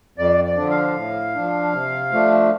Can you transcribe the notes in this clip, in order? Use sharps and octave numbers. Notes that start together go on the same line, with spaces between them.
F2 D5
D5
D3 F3 D4
F5
A2
F3 D4
C3
F3 A3 D4